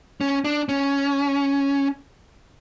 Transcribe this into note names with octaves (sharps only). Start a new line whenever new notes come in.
C#4
D4
C#4